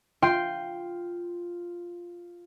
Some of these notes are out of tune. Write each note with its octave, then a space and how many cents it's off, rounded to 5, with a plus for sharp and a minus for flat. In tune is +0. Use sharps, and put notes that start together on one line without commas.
F4 +0 G5 +0 C6 +0